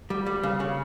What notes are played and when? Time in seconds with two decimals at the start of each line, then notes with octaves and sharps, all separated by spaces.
0.10 G3
0.26 G3
0.43 C#3
0.60 C#3